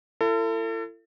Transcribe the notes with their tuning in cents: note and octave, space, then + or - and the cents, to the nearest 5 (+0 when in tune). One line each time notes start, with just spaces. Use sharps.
E4 +40 A4 +35